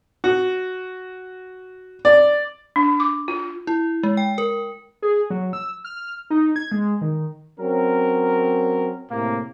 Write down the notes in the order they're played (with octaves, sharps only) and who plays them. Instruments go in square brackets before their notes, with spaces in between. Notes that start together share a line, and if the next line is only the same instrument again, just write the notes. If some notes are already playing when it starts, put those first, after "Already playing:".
[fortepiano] F#4
D5
[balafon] D4
D6
F4
[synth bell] E4
G#3
G5
A#4
[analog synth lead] G#4
F#3
E6
F6
D#4
G#6
G#3
D#3
[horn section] F#3 C4 C#4 A#4
A2 C3 A#3